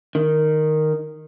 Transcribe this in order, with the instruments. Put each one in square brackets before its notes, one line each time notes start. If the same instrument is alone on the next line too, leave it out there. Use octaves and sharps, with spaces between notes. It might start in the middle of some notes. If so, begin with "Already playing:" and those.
[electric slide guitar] D#3